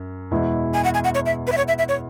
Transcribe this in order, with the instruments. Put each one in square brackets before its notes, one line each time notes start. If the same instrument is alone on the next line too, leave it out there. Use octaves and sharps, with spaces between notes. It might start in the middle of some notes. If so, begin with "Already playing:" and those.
Already playing: [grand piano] F#2
E2 B2 G#3 E4
[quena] G#5
F#5
G#5
F#5
C#5
E5
B4
E5
C#5
E5
E5
C#5